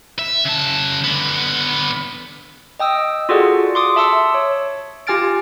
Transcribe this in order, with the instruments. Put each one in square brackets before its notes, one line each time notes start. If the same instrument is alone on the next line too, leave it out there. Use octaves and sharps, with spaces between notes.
[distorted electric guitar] E5
C#3 A5
D3 B3
[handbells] D#5 G5 D#6 E6
F4 F#4 G#4 A4 D5 F#5
C6 D6 D#6
E5 A5 C6 E6 C#7
C#5
F4 G4 G#5 F6 A6 D7